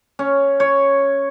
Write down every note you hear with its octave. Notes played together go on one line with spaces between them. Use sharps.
C#4
C#5